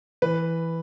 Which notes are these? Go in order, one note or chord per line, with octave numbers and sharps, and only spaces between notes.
E3 B4